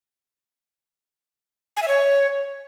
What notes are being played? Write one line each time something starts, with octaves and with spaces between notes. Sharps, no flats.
G#5
E5
C#5